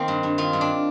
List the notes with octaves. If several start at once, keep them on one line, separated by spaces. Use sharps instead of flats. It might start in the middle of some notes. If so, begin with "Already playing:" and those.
Already playing: D#3 A#3 C4
G2
G2
D#3 F4
G2
D4